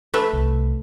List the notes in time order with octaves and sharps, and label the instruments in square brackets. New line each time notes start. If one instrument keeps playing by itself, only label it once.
[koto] A3 B4 E5
[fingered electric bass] C2